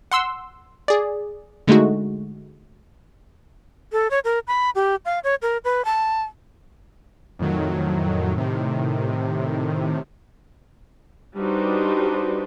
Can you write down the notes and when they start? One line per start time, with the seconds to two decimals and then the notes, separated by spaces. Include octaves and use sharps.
0.11 F#5 C6 E6
0.88 G#4 D5
1.67 D3 G#3 A3 D#4 F#4
3.92 A4
4.11 C#5
4.25 A#4
4.47 B5
4.75 G4
5.05 F5
5.24 C#5
5.42 A#4
5.65 B4
5.85 A5
7.39 F2 A2 D#3 F#3
8.35 A2 C3 D#3
11.36 G3 D4 D#4 F#4 B4 C5